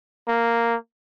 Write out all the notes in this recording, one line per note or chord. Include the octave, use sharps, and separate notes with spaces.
A#3